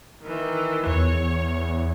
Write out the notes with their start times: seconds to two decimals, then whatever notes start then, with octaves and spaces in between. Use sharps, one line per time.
0.23 D#3 E3
0.86 E2 C#5